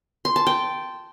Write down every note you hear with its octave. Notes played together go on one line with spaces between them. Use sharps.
C6
A5
G5